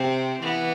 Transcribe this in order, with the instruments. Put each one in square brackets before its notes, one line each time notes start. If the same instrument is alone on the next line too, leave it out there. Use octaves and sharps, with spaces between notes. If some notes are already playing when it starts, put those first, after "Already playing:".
Already playing: [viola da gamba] C3 [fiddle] C4
[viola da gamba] E3 [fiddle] B3